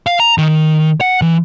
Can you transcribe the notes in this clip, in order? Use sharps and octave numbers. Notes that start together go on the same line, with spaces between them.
F5
A#5
D#3
F#5
E3